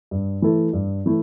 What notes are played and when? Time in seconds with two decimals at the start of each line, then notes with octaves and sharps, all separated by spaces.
0.11 G2
0.42 E3 A3 E4 A4
0.73 G2
1.06 E3 A3 E4